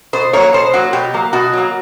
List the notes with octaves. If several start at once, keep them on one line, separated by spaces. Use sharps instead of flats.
B2 C5
F#3 A#3 C#5
B2 C5
F#3 A#3 F#4
B2 G4
F#3 A#3
B2 F#4
F#3 A#3